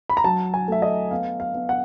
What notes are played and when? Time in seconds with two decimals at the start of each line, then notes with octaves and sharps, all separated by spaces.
0.09 B5
0.17 A#5
0.24 F#3 A5
0.54 G#5
0.68 A3 E5
0.82 D#5
1.11 B3 F5
1.40 F5
1.54 B3
1.69 F#5